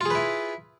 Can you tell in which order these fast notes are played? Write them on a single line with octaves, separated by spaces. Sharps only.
F4 G#4 B4 E4